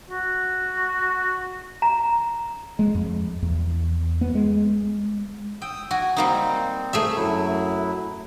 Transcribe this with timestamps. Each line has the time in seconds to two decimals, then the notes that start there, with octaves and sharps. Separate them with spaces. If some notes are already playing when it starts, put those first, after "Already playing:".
0.10 F#4
1.82 A#5
2.79 G#3
2.95 F2
3.42 E2
4.21 B3
4.35 G#3
5.62 G5 D#6 E6
5.91 F#4 G#5
6.17 G3 A#3 C4 D#4
6.93 A3 G#4 E5
7.16 F#2 F#3 E4